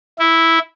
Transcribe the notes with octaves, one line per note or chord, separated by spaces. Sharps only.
E4